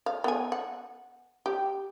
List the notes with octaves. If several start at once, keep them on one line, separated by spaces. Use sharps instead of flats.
F5
B3 G#5
F#5
G4